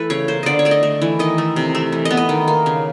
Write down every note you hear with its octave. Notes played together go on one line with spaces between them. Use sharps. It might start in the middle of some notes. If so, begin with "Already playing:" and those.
Already playing: E3 A3 A4 B4
C#3 C#5
A#3 C5
D3 D5 D#5
C#5
A3 D5
D#5
A3
E3
D#3 D#5
A3
C3
A3
E3
D#5
B3
D#5
D#3
A#3
C#3